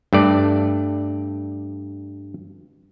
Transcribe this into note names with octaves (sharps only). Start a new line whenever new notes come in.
G2 A3 D5